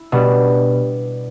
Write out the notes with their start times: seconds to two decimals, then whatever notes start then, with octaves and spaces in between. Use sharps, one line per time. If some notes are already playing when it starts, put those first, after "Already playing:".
Already playing: E4
0.12 B2 G3 B3 D4